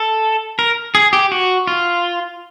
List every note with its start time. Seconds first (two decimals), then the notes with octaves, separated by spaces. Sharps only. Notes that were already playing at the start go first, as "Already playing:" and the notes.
Already playing: A4
0.59 A#4
0.95 G#4
1.13 G4
1.32 F#4
1.67 F4